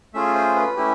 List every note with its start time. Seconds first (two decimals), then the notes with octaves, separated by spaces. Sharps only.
0.14 A3 C#4 F4 G#4 E5
0.35 C5
0.56 B4
0.77 A3 C#4 E4 G4